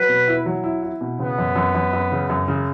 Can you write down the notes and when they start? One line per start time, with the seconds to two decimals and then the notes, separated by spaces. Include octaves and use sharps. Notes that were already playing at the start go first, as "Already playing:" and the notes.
Already playing: F#3 B4
0.09 B2
0.28 E4
0.46 F#3
0.64 E4
0.83 E4
1.01 B2
1.19 C#3 B3
1.38 F#2
1.56 F#2
1.75 F#2
1.93 F#2
2.12 C#3
2.30 F#2
2.48 C#3